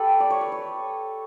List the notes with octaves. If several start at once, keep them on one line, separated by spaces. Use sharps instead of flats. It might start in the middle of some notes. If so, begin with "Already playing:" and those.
Already playing: G4 A4 B4
D5
C#5
B4
C#5